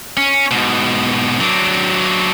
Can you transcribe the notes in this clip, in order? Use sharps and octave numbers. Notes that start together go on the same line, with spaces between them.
C#4
G#2 B2
F#3 D4